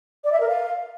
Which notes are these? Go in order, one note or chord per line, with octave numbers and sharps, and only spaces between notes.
D5
E5
A#4
F5